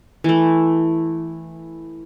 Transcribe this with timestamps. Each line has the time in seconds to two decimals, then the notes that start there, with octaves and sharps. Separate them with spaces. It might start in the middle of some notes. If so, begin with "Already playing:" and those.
0.24 E3 A3